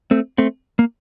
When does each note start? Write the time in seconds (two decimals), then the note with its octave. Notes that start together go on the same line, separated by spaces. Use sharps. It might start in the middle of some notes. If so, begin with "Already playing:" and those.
0.11 A3 C4
0.38 A3 C4
0.79 A#3